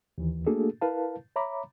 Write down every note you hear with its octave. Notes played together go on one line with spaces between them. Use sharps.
D#2 E3
A3 A#3 D4 F#4 G#4 A4
E4 A#4 B4 F5 A5
C#5 E5 A#5 B5 D6